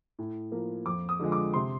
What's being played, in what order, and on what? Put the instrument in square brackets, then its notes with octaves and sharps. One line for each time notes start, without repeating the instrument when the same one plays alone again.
[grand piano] A2
F3 A#3
F2 D6
D#6
D3 F3 G#3
D6
C3 C6